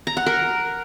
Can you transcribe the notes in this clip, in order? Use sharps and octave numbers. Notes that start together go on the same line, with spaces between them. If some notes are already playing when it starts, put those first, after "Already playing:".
A#5
F#5
A#4